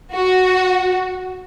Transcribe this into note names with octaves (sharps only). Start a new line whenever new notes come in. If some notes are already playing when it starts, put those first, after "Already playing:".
F#4